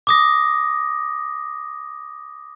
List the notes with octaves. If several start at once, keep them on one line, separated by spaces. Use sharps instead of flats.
D6 D#6 A#6